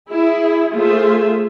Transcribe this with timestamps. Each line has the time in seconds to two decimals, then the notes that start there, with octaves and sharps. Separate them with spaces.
0.10 E4 G#4
0.74 A3 F4 G#4 C5 E5